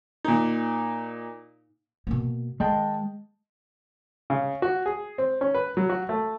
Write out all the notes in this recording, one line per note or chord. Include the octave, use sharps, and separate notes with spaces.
A#2 D#4
B2 A#3
D#3 G#3 D#5 G5 A5
C#3
F#4
G#4
C4
C#4
B4
F#3
F#4
A3